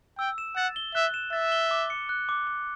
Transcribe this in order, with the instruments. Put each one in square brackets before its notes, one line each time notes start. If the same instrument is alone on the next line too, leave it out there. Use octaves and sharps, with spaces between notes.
[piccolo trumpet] G5 [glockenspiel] E6
[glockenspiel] E7
[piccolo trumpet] F#5 [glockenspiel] A6
[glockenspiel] G7
[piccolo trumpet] E5 [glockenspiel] F#6
[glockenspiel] E7
[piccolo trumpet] E5 [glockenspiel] A6
[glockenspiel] G7
D6
C#7
F#6
D6
D6